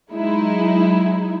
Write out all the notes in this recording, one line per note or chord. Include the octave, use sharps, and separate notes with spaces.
F#3 G#3 D#4 E4